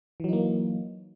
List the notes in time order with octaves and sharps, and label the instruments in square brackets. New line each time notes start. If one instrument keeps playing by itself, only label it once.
[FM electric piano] E3
F#3
D#4
A#3